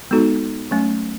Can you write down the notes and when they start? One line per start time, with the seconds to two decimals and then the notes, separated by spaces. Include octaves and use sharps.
0.11 G#3 B3 D#4 F#4 A4
0.71 F#3 A3 C#4